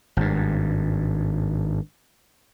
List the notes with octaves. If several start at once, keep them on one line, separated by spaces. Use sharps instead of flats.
G#1 G2